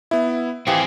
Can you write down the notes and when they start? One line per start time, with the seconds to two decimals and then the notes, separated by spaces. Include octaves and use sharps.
0.11 B3 E4 E5
0.67 E3 C4 F4 G4 G#4 G#5 C#7